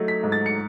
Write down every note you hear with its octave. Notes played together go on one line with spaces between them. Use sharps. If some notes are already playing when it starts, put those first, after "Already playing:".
Already playing: F#3 A3 D#4
B6
G#2
A6
C#7